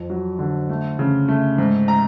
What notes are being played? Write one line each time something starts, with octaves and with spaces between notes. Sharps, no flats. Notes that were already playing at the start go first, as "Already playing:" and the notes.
Already playing: F2
F#3
D3
A3
C#3
A3
G#2
A#5